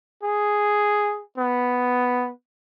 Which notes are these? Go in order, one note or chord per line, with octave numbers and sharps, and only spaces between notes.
G#4
B3